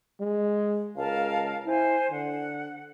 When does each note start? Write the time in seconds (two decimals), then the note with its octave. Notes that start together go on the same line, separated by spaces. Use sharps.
0.20 G#3
0.96 C#2 A#4 F5 A5
1.65 E4 C5 G#5
2.11 D3 F#5